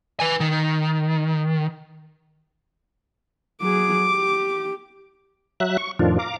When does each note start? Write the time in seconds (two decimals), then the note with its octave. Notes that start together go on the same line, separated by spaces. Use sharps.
0.20 B4 G#5
0.40 D#3
3.62 F#3 G#4 D6
4.10 G4
5.60 F#3 E5 F#6
5.78 C#6
5.99 F2 A2 D#3 F3 D4 F4
6.19 F5 A#5 D6